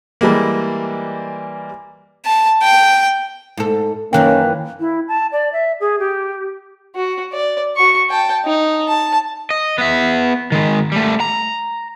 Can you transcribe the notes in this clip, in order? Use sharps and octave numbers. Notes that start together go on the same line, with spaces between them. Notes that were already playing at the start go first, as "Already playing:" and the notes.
E3 G3 G#3 A#3
A5
G5
G#2 A4
F#2 D#3 E3 A#3 C#4 G5 F#6
E4
A5
D5
E5
G#4
G4
F#4
D5
F#4 C#6
G5 A5
D#4
A5
D#5
B3 E5
D#3 G#3
G3 A3
A#5